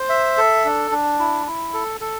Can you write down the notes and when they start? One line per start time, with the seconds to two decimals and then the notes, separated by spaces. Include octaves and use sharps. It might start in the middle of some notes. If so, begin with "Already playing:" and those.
Already playing: C5
0.09 E5
0.37 A4
0.65 D4
0.91 D4
1.19 E4
1.47 E4
1.74 A4
2.01 A4